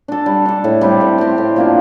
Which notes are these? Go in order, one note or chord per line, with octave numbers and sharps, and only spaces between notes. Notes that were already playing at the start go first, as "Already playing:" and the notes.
D4 A4
G3
D4 A4
A2
G3 C4 G4
A2
G3 C4 G4
A2
F3 A#3 D4